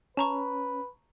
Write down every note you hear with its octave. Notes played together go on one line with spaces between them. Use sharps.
C#4 B4 A5 A#5 C#6